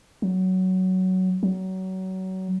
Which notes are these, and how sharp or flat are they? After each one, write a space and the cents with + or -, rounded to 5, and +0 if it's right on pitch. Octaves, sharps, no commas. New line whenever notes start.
F#3 +10
F#3 +25